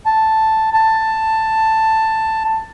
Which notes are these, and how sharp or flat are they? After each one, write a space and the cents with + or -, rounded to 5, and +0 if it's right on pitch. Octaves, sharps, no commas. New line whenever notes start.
A5 +0
A5 +10